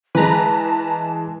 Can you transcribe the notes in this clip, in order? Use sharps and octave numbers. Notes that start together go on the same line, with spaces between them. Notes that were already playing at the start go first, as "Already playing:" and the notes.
E3 G#3 B4 A5 A#5